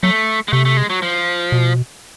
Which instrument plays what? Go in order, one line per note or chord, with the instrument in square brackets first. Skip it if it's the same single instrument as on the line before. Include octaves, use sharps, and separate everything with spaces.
[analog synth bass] F#3 [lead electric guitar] A3
[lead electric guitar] G#3
[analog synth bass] C3 [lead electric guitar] A3
[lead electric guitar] A3
G#3
F#3
F3
[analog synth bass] B2